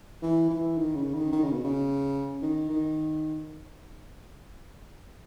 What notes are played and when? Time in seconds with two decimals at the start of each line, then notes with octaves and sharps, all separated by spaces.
0.22 E3
0.50 E3
0.77 D#3
0.95 C#3
1.14 D#3
1.32 D#3
1.43 C#3
1.53 B2
1.64 C#3
2.42 D#3
2.69 D#3